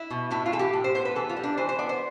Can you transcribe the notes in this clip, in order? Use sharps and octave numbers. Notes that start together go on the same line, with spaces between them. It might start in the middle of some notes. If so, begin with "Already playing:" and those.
Already playing: E4
B2
A2 E4
F4
E3 A4
G4
A2
C5
B3 C5
B4
E3 A4
F4
G3
D4
E3 C5
C5
B3 D5
C5